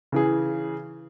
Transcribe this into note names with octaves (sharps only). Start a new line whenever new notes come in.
C#3 E3 G#4